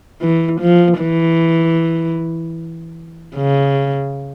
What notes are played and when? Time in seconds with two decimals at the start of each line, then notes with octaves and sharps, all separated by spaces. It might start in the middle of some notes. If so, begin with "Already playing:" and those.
0.21 E3
0.60 F3
0.99 E3
3.36 C#3